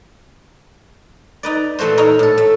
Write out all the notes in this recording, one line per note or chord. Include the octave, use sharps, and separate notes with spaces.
D#4 B4 D5
A#2 E3 A3 F#4 C5
D#4 E4 F#4 A#4 C#5
A2 A4
A3